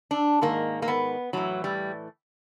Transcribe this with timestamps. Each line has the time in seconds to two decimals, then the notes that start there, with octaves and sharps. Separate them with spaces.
0.11 D4
0.41 G#2 D#3 A#3
0.82 A#3
0.88 B3
1.33 A2 E3 F#3
1.64 G3